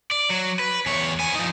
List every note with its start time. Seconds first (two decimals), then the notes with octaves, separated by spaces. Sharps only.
0.11 D5
0.30 F#3
0.59 B4
0.86 E2 C#5
1.19 B3 G#5
1.35 F3 D#4